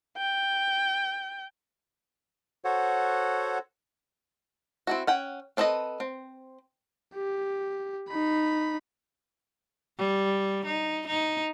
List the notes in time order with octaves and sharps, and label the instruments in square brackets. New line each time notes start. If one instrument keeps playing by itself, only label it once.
[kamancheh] G5
[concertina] F#4 A4 C5 C#5 F#5
[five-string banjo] C4 E4 F#4
C#4 F#5 G5
C4 D4 A4 B4 D#5
C4
[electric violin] G4
D#4 B5
[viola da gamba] G3
D#4
D#4